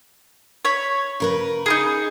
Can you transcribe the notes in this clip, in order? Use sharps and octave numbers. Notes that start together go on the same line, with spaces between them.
C#5 B5
C#3 A#4 B4
D#4 F4 G#4